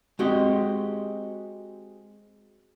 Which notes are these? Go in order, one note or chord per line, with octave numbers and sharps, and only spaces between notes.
G#3 C4 F#4 G4 D#5